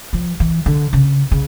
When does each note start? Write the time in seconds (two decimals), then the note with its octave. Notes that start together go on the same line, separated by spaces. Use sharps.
0.13 F3
0.40 E3
0.66 D3
0.93 C#3
1.31 C#3